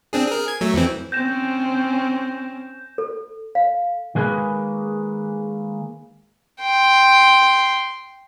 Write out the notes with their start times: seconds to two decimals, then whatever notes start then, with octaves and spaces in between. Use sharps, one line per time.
0.13 C4 D4 G#4
0.27 G#4 A#4
0.48 G#6
0.61 F#3 A3
0.74 F2 E3 C4
1.12 C4 C#4 G6 A#6 E7
2.98 A4
3.55 F5
4.15 D#3 G#3 A#3 G#4 B4
6.61 G5 C6